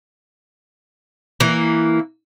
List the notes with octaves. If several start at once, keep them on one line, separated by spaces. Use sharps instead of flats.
E3 A#3